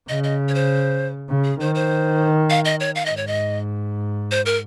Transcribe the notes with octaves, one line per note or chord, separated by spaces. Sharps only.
C#3 D#5
D#5
C#5
C5
C#3
G#4
D#3 C5
C5
F5
D#5
C#5
F5
G#2 D#5
C#5
D#5
C5
A#4